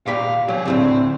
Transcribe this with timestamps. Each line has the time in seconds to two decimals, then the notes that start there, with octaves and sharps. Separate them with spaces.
0.06 D#2 A#2 G4 F5 B5
0.48 F#3 G4 G#4
0.66 D2 A2 C#3 C4